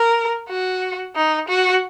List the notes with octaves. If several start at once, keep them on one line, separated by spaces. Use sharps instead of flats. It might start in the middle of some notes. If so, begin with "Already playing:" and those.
Already playing: A#4
F#4
D#4
F#4